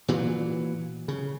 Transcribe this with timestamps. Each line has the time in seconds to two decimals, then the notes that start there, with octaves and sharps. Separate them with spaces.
0.08 A#2 E3 F#3
1.08 C#3